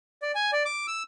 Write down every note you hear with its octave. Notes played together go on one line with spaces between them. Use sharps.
D5
G#5
D5
D6
E6